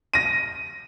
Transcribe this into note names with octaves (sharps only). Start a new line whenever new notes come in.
A#6 D#7